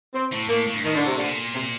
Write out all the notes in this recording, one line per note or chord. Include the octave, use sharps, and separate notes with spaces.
C4
A2
A2 A#3
A2
G2
A2 D#3
D3
C3
A#2 D3
C3